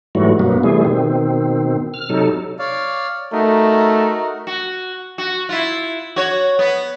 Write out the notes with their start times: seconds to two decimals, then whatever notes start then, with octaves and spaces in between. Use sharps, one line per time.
0.15 G#2 E3 F#3 G3 A3 F#4
0.40 G2 B2 F#3 A#3 B3
0.63 C3 E3 G3 A3 G#4
0.85 B2 D#3 C4
1.94 F6
2.09 C3 F#3 D#4 A4
2.59 C#5 D5 F5
3.33 A3 D#4 F#4 A#4
4.47 F#4
5.18 F#4
5.49 E4 F4
6.16 F#4 C#5
6.59 B3